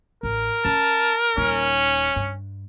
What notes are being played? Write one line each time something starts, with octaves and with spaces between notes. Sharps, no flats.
A1 A#4
C#4 A5
D#1 C#4 D#4
G2